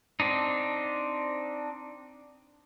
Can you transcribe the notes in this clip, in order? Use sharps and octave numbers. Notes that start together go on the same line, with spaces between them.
C4 D4 D#4